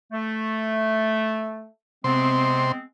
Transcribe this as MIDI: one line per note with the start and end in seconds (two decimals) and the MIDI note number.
0.12 1.68 57
2.04 2.72 48
2.04 2.82 56
2.04 2.82 59
2.04 2.82 60
2.04 2.72 84